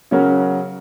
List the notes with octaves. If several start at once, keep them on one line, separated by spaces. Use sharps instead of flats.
C#3 F#3 C#4 F#4 A#4